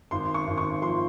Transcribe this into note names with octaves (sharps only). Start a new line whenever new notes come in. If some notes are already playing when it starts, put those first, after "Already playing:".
G#1 C6
C#6
G#1
C#6
F3 C6